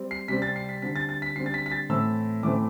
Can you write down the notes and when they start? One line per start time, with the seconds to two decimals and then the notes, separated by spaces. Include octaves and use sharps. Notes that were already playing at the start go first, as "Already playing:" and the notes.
Already playing: G3 C4
0.11 C7
0.28 C3 G3 C4 B6
0.42 A6
0.56 C7
0.69 B6
0.82 D3 G3 C4 B6
0.96 A6
1.09 A6
1.22 B6
1.35 D3 G3 C4 C7
1.46 A6
1.54 B6
1.66 B6
1.72 A6
1.89 A2 E3 A3 C4 E6
2.43 A2 E3 A3 C4 D6